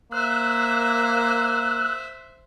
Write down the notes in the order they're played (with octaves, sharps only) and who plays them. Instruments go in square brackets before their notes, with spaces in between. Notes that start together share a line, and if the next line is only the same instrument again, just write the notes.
[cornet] A#3 [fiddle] C5 E5 [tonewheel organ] E6 F#6